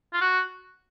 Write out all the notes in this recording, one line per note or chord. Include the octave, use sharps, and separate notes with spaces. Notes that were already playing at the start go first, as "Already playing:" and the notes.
F4
F#4